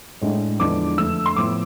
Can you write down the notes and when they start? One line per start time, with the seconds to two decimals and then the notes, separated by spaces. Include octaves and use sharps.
0.21 A2 G#3 D4
0.60 E2 D3 F3 G#3 D4 D6
0.98 F2 D3 A3 E6
1.26 C6
1.36 A2 F3 B3 E4 D6